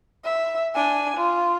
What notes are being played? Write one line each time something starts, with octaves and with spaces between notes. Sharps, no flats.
E5
D4 G#5
F4